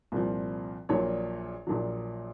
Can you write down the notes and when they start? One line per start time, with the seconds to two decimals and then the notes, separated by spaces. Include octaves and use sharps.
0.12 C2 A#2 F3
0.89 A#1 A#2 F#3 C#5
1.67 A#1 A#2 F#3